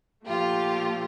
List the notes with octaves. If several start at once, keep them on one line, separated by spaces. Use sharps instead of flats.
A#2 F3 A3 F4 G4